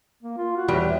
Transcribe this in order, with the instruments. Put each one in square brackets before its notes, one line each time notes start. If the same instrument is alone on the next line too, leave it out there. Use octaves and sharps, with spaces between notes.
[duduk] A#3
F4
F#4
[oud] E2 G3